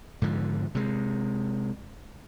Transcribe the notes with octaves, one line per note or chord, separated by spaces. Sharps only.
G#2 D3 F3
C3 G#3